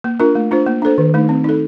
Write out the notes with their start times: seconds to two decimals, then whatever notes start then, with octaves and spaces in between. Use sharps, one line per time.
0.04 A#3
0.20 D4 F4 A#4
0.35 A3
0.51 D4 F4 C5
0.66 A#3
0.82 D4 A4 C5
0.98 D#3
1.14 A3 D#4
1.29 C4
1.44 D#4 A4